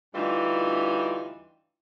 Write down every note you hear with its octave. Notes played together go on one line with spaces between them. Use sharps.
D2 G2 E3 G3 D#4 F4